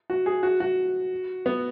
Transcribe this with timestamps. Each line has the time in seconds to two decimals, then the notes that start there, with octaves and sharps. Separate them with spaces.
0.10 F#4
0.26 G#4
0.43 F#4
0.60 F#4
1.46 B3